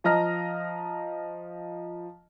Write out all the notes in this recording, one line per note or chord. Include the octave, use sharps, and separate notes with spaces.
F3 D#5 A#5 F6 A#6